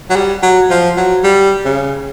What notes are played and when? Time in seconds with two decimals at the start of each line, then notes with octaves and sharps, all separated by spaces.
0.10 F#3
0.16 G3
0.43 F#3
0.70 F3
0.97 F#3
1.24 G3
1.65 C#3